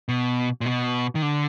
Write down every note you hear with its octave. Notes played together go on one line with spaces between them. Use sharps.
B2
A#2
B2
D#3
D3